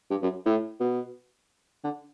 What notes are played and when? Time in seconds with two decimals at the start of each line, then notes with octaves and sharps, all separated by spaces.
0.11 G2
0.23 F#2
0.45 A2
0.80 B2
1.84 D3